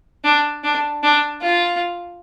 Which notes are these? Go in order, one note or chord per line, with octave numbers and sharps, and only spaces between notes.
D4
D4
D4
F4